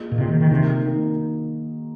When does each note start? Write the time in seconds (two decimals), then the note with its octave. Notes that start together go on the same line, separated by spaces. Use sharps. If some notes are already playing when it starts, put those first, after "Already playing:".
Already playing: A#3 F4 G#4 D#5
0.12 A#2
0.18 C3 A#3 F4 G#4 D#5
0.29 D#3
0.40 D#3
0.50 C3 D#3 A#3 D#4 A#4
0.83 D#3 A#3 D#4 A#4